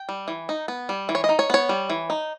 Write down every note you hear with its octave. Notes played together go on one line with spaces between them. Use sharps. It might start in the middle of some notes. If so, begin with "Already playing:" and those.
Already playing: G5
G3
E3
D#4
B3
G3
E3
C#5
D#5
D#4
C#5
B3 C#5
G3
E3
D#4